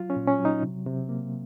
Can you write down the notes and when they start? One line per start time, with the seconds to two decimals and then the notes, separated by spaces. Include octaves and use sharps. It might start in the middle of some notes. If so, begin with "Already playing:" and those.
Already playing: F#3 F4
0.10 C#4
0.16 A#2
0.27 C#4
0.39 F#3
0.45 D#4
0.63 C3
0.86 C3
1.09 A#3